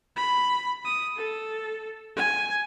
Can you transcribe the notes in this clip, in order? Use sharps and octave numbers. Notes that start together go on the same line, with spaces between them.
B5
D#6
A4
G#5